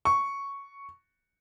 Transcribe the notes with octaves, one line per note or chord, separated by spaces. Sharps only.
C#6